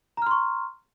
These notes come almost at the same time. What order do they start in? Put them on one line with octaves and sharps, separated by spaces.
A#5 F6 C6 C#6